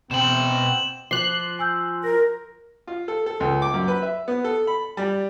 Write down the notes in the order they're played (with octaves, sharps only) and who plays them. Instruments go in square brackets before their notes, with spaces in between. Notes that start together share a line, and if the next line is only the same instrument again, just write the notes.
[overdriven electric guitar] B2 G5 [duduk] C4 [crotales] E7 F#7
[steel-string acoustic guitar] F3 [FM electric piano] C6 F#6 [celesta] D6
[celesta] G#5 E6 G6
[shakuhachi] A#4 [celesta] A#6
[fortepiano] F4
A4
A4
C#2
D6
F#2
B4
E5
B3
A4
B5
G3